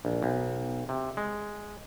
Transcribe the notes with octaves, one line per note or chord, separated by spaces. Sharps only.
A#1
B1
C3
G#3